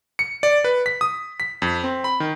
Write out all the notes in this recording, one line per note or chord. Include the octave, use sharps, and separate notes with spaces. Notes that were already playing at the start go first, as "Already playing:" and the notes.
C#7
D5
B4
B6
D#6
B6
F2
C4
B5
D#3